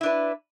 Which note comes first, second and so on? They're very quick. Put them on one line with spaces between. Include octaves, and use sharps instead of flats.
E4 D4 B4